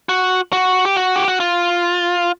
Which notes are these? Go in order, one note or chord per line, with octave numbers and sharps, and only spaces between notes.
F#4
F#4
G4
F#4
G4
F#4
F4